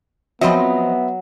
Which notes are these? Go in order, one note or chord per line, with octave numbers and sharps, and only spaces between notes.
F3 F#3 B3 C4 D#5 E5 B5